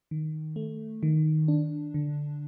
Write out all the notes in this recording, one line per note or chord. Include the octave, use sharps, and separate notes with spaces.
D#3
A3
D#3
D4
D3